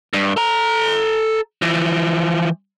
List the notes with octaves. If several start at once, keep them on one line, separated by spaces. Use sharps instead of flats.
G2
A4 A#5
E3 F3